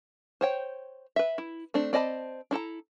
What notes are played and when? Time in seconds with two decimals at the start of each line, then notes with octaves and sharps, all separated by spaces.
0.41 C5 C#5 G5
1.16 B4 E5
1.38 E4
1.74 A3 C4 D4
1.93 C4 D5 D#5 A5 B5
2.51 D4 E4 A4 A#5